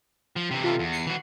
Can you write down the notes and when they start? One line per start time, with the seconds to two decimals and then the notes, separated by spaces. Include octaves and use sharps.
0.36 F3
0.51 C3 E3
0.64 F4 A4
0.79 E2
0.92 C7 C#7
1.07 E3 F#4